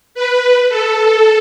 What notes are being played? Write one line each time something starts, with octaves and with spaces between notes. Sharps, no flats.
B4
A4